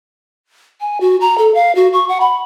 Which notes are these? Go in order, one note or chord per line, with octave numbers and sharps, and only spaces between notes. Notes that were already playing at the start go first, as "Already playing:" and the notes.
G#5
F#4
A#5
A4
F5
F#4
C#6
F#5
B5